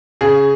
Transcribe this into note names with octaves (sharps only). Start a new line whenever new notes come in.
C#3 G#4